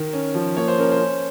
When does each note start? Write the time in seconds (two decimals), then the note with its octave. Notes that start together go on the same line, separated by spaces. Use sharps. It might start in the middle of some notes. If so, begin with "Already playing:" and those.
Already playing: D#3 A#4
0.13 C#4
0.34 F3
0.56 A#3 C#5
0.68 C5
0.78 C#4 A#4
0.91 C5
0.99 C#4